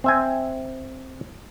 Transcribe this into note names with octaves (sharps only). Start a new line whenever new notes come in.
C4 E5 G#5